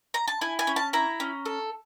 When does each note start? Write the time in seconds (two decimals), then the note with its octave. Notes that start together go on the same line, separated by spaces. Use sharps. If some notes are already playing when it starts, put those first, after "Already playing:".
0.14 A#5
0.28 A5
0.41 E4 G#5
0.59 G#5
0.67 C#4
0.76 A5
0.93 E4 A#5
1.20 C#4
1.46 A4